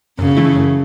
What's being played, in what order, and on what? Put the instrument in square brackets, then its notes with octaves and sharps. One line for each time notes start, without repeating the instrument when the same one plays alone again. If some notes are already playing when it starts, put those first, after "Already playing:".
[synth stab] F#2 [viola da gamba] C#3
[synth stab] E3 A3 E4
F#2